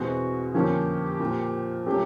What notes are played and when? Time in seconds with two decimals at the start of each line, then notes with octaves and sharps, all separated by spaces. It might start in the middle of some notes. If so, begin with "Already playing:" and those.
Already playing: E2 B2 G#3 C4 F#4
0.54 F2 D3 F3 A#3 C#4 G4
1.20 A#2 F3 A#3
1.86 A#2 F#3 A3 C#4 G4